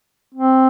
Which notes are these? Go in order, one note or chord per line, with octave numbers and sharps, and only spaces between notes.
C4